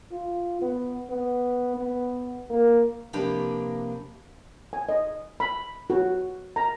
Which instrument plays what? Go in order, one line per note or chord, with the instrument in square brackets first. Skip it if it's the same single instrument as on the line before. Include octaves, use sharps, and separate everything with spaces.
[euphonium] F4
B3
B3
B3
A#3
[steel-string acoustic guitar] C3 F3 A#3 D4 G4 B4
[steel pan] G#5
D#5
B5
F#4
A#5